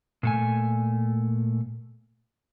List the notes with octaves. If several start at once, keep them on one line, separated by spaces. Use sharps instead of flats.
A#2 A3 G#5